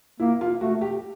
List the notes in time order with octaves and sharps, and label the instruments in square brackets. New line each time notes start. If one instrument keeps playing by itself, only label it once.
[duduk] A#3 [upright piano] E4
[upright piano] F4
[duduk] A3 [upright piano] F#4
[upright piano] G4